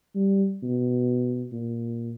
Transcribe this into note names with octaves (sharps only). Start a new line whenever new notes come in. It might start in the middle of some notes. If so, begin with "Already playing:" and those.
G3
B2
A#2